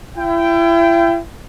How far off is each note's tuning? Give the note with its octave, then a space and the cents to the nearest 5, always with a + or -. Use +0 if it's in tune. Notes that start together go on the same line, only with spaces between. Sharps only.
E4 +35 G5 -5